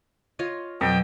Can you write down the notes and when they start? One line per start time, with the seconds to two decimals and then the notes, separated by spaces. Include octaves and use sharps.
0.39 F4 C#5 D#5
0.81 F2 B2 F#3 G5